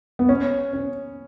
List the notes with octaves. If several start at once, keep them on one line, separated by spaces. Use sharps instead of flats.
B3
C#4
C#4